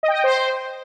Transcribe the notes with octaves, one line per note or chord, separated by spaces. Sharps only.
D#5
G5
D#5
G5
C5